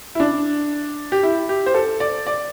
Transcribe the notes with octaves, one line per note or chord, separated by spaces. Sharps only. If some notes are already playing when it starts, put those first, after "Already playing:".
E4
D4
G4
E4
G4
C5
A4
D5
D5